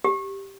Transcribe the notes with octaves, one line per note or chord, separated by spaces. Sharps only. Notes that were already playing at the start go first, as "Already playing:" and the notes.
G4